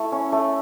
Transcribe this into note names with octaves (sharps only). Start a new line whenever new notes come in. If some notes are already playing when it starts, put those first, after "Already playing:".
Already playing: A3 E4
C#4
A3